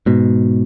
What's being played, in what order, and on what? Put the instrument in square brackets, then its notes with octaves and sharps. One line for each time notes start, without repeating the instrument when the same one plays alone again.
[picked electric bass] G#2 B2